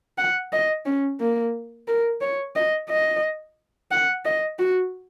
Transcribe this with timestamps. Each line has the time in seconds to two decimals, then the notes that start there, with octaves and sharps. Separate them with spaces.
0.18 F#5
0.53 D#5
0.85 C#4
1.20 A#3
1.88 A#4
2.21 C#5
2.56 D#5
2.90 D#5
3.91 F#5
4.25 D#5
4.59 F#4